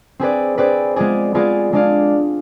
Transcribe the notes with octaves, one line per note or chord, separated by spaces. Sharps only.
C4 G#4 B4 D5
C4 G#4 B4 D5
G#3 B3 F4 G#4 D5
G#3 B3 F4 G#4 D5
G#3 D4 G#4 D5 F5